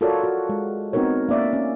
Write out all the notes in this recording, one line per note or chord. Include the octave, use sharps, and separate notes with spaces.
F4 F#4 A4 A#4 C#5 D5
F#4
G#3
B3 C4 D#4 F#4 A#4 C#5
A#3 C#4 D5 E5
C#4